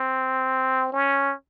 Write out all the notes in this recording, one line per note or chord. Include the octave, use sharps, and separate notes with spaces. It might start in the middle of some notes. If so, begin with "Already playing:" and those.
Already playing: C4
C#4